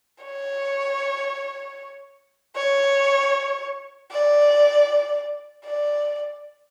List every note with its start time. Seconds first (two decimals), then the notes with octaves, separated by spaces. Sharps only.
0.24 C#5
2.56 C#5
4.11 D5
5.65 D5